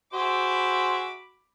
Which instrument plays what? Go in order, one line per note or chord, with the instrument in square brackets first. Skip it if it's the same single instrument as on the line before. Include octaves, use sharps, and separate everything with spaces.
[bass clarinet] F#4 [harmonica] G#4 C5 E5 [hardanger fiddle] B5 D6